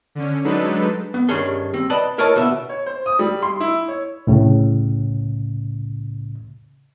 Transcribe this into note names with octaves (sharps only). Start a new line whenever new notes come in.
D3 C#4
F#3 G#3 D4 D#4 A4 B4
B3
G2 D#3 C#4 G#4 G#5 C6
C4
B4 D5 D#5 A5 B5
E4 A#4 C#5 D#5 A5
B2 D3 B3 E5
C#5
C5
D#6
G3
C6
E4
C#5
C2 A2 C#3